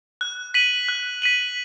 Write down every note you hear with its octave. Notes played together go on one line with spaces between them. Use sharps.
F#6
B6 D#7 F#7
F#6
B6 D#7 F#7